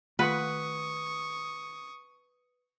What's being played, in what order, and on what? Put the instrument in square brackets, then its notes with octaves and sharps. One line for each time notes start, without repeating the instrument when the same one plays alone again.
[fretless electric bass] D#3 A3 [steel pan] F4 F#5 [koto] B4 [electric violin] C#6 D#6